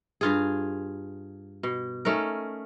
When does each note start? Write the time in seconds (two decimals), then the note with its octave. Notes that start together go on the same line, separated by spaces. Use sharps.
0.21 G2 F4 G#4
1.63 B2
2.05 A3 C#4 D#4 A#4